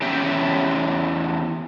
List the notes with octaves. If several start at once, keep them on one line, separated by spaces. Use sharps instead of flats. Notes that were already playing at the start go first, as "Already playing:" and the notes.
E2 C#4 G4 E5 G5